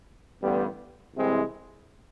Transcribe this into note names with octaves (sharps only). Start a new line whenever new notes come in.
A1 G2 D3 G3 B3
C2 C3 E3 G#3 C4